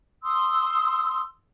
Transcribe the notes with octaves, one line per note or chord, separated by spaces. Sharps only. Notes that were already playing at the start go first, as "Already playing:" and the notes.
C6 D#6 E6